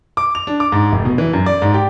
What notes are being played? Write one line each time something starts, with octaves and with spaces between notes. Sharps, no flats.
D6
F7
D4
D6
G#2
F1
B2
E3
F#2
D5
G#2
G4